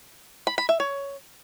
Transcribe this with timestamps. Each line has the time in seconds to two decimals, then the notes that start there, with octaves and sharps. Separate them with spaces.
0.47 B5
0.58 B5
0.69 E5
0.80 C#5